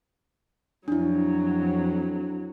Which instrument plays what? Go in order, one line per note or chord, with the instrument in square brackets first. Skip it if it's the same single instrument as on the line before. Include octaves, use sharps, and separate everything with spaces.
[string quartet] F2 F#3 [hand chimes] D4 E4